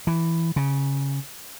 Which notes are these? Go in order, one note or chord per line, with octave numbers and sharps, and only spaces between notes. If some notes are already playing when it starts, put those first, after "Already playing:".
E3
C#3